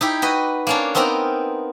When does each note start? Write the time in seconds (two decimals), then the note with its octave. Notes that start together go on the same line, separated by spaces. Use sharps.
0.01 D#4 E4 G4
0.22 F#4 B4 D#5
0.67 A#3 C#4 D4
0.95 B3 C4 D#4 A#4 A#5